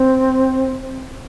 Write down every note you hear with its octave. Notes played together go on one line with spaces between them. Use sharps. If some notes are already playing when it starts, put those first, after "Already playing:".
Already playing: C4